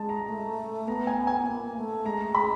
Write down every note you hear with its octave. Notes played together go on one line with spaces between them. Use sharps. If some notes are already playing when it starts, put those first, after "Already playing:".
Already playing: G#3 A5
A#5
A3
B3 A#5
G#5
G#5
A#3
A3
G#3 A#5
B5